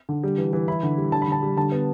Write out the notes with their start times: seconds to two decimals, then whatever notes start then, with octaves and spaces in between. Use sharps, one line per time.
0.09 D3
0.23 G3
0.38 E3
0.53 E3
0.68 E4 B5
0.83 D3
0.98 G3
1.12 D3 A5
1.22 B5
1.28 D3 A5
1.42 G3
1.57 D3 A5
1.72 B3